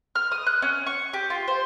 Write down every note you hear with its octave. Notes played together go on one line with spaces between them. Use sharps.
F6
D#6
F#6
C#4
C#6
G4
F4
C5